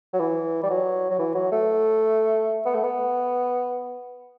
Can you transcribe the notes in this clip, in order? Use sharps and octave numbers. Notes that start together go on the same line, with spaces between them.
F#3
E3
G3
F#3
F#3
E3
F#3
A3
B3
A3
B3